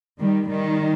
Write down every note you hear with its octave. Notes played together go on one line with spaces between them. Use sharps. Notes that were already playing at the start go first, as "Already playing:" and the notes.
D#3 G3
D#3 G3